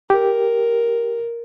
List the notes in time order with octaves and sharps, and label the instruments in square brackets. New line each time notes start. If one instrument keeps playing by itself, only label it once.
[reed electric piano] G4 [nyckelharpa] A#4